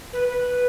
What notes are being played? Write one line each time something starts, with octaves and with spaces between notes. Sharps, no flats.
B4
B4